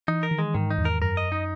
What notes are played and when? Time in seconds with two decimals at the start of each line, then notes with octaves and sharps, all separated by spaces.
0.08 E3 D#4
0.23 A#4
0.31 D#3
0.39 G#3
0.54 G#2 D#3
0.71 D#4
0.78 E2
0.85 A#4
1.01 F#2 A#4
1.17 D#5
1.32 D#4